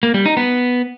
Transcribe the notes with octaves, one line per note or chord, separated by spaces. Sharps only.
A#3
G3
D#4
B3